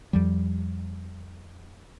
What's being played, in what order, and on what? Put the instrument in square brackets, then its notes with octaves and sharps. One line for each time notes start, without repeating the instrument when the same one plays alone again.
[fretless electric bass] F2 F3 G3